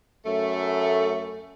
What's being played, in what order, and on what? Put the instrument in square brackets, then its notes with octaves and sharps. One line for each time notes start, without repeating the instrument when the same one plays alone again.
[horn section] F#2 A3